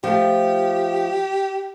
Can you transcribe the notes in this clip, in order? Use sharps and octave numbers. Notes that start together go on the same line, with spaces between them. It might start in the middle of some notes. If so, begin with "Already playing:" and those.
F3 A3 G4